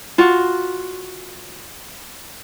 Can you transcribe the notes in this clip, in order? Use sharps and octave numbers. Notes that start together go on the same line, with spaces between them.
F4 F#4